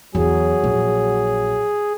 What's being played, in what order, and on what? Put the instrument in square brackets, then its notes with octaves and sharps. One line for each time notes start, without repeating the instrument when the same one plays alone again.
[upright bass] E2 [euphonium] F#3 [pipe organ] G#4
[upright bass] A#1